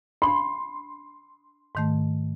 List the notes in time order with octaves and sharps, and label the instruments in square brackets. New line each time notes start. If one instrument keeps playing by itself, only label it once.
[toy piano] D4 B5 [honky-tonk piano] C6
[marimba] G#2 D#3 A3